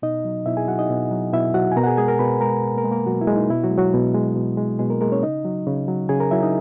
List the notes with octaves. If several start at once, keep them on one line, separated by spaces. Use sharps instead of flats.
B2 D#4 D#5
F#3
B2 E4 E5
G#4 G#5
F#3 F#4 F#5
D#4 D#5
B2
F#3
B2 E4 E5
F#3 F#4 F#5
G#5
B2 A#4 A#5
F#5
G#4 G#5
G#3 G#4 G#5
A#4 A#5
B2 B4 B5
G#3 A#4 A#5
B2
A#3 A#4
G#3
A#3 A#4
B2 F#3 F#4
E4
G#3
D#4
B2 E4
F#3 F#4
G#3
F#3 F#4
B2
G#3
B2
G#3
B2 G#3 G#4
A#3 A#4
G#3 A#3 A#4
C#4 C#5
C#3 D#4 D#5
F#3
C#3
F#3
C#3 G#4 G#5
A#4 A#5
F#3 E4 E5
D#4 D#5